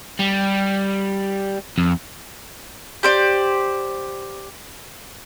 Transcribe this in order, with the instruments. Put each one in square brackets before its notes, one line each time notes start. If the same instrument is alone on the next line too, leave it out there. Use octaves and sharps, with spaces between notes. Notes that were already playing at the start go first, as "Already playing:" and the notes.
[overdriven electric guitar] G3
F2
[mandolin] G4 C5 D5